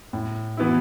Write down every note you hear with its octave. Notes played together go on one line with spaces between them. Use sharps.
A2
E3 B3 E4